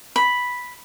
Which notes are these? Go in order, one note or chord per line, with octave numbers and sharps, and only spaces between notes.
B5